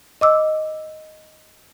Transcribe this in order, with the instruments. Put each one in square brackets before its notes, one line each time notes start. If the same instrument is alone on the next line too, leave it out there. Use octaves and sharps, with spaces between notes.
[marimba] D#5 D6 E6